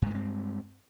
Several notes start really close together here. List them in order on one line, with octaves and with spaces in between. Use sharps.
G2 G#3 A3 C4